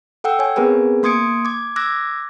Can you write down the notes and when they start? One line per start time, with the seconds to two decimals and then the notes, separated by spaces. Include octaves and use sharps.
0.24 A4 F#5 G5 E6
0.39 C#5 G#5
0.56 B3 C4 G#4 A#4 B4 G#5
1.03 A#3 C6 D#6 G#6 C#7 D7
1.45 D6 G#6
1.76 D6 E6 F#6 G#6 A#6